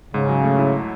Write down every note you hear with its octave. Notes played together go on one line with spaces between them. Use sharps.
G#2 C#3
F#3
A3
E4